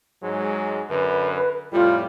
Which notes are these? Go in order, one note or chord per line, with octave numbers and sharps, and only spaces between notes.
G#2 F#3 G#3
F#2 D3 B4
F2 A2 G3 F4